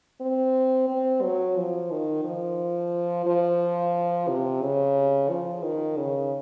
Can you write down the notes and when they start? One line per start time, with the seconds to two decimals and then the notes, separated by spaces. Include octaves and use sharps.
0.21 C4
0.89 C4
1.23 F#3
1.57 F3
1.91 D#3
2.24 F3
3.26 F3
4.28 C3
4.62 C#3
5.30 F3
5.64 D#3
5.97 C#3